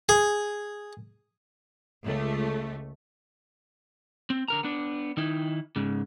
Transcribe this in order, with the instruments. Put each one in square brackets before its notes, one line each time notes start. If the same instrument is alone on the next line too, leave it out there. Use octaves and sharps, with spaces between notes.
[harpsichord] G#4
[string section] C#2 A3
[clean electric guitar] C4
D3 A#4 A#5
B3 D4
D#3 D#4 E4
G#2 C#3